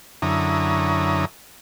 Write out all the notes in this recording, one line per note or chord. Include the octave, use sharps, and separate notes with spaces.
F#2 D3 E4 C#5 A#5 D#6